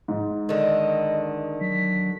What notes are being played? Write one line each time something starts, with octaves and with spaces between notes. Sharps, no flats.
G#2
D3 D#3 D#5
F#3 B6